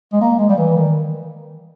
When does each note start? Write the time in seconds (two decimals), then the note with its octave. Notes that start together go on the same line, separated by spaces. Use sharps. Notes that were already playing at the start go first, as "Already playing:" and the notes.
0.13 G#3
0.21 A#3
0.39 G#3
0.49 G3
0.58 E3
0.77 D#3